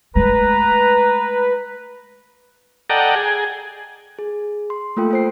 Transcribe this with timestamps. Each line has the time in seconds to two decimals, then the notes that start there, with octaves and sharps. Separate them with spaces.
0.15 G#3 A3 B4 A#5
2.90 A4 D5 D#5 F#5 G5 A#5
3.15 G#4
4.19 G#4
4.70 C6
4.97 A3 A#3 F4 A4 G5
5.11 F4 C5 C7